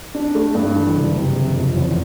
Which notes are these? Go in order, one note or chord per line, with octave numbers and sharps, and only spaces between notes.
D4
A3
G2
E3
F#1
C3
F#1
F2
E2